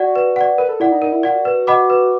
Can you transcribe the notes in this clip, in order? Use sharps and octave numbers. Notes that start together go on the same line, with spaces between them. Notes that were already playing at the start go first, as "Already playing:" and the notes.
Already playing: F#4 D5 F#5
B4
D5 F#5
A#4 B4
A4
E4 D5 F#5
D#4
D#4 A#4
E4
F4 D5 F#5
F#4
B4
D#5 F#5 B5 D6
B4